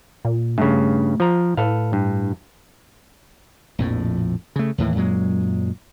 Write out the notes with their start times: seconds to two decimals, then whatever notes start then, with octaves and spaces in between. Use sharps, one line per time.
0.25 A#2
0.58 G2 C#3 A3
1.20 F3 A#5
1.57 A2 A4 B4 F5
1.93 G2
3.79 A#1 F2 A2
4.56 C#3 A3
4.78 D#2 A2 E3
4.96 F#2 A#2 F#3 G#3